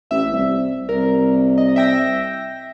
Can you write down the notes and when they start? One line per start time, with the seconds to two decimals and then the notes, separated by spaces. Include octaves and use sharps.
0.11 A1 E5
0.31 C2
0.89 C2 A#4
1.58 D#5
1.76 E5 G5 A#6